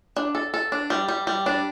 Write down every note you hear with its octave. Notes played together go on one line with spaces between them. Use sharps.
D4
A4
A4
D4
G3
G3
G3
D4